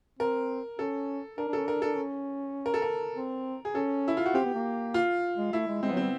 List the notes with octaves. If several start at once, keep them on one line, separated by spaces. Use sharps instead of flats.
C4 A#4
C#4 A4
D4 A#4
D4
C#4 A4
D4 A#4
D4 A4
C#4
A#4
A4
A#4
C4
G#4
C#4 A4
E4
F4
F#4
C4 G4
B3
A#3
F4
G#3
A3 E4
G#3
G#3 C4
B3
F#3
G3 C4